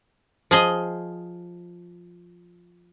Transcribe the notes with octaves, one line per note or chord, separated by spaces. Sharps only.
F3 G#4 D#5